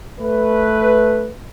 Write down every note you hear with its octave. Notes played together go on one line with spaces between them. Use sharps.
A3 B4